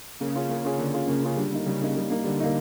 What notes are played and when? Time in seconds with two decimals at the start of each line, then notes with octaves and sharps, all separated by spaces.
0.20 C#3 A#3
0.35 C#4 F4 G#4
0.49 A#3
0.64 C#4 F4 G#4
0.78 D3 A#3
0.94 C#4 F4 G#4
1.07 C#3 A#3
1.23 C#4 F4 G#4
1.37 D3 G3
1.52 A#3 D#4
1.66 C#3 G3
1.81 A#3 D#4
1.95 G3
2.10 A#3 D#4
2.24 D3 G3
2.40 A#3 D#4